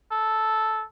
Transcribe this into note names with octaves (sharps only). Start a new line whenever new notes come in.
A4